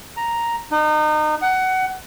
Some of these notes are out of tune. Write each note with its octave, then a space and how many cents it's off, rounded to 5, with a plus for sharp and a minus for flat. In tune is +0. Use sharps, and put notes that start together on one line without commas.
A#5 +0
D#4 -30
F#5 +20